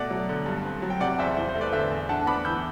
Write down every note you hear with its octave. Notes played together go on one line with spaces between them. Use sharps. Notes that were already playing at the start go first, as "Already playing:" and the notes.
Already playing: B2 A3 D5 F#5
F#3
D3
G2
C4
F#3
G5
C3 D5 F#5
E2 C5 E5
E4 C5
C5
A3
B4 D5
D3 C5 E5
E2
D4 F#5 A5
B3 B5 D6
E3 E6 G6